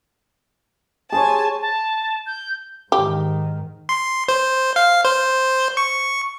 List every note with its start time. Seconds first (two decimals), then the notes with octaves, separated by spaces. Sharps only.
1.12 G#4 C5 C#5 G#5 A5
1.61 A5
2.26 G6
2.92 G#2 D#3 G4
3.89 C6
4.29 C5
4.76 F5
5.05 C5
5.77 C#6